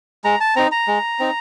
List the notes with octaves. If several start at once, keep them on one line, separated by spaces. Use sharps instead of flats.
G#3 A#5
A5
C4 D#4 A#5
A#5
G#3
C4 D#4